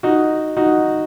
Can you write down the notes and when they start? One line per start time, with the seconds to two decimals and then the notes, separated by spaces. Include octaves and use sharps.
0.03 D#4 F#4
0.57 D#4 F#4